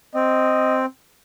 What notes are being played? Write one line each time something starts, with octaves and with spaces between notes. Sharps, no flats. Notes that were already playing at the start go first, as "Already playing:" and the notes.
C4 D#5